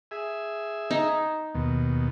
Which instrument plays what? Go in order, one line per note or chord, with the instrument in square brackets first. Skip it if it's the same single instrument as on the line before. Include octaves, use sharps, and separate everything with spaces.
[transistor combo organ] G#4 E5
[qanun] D#4
[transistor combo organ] D#2 B2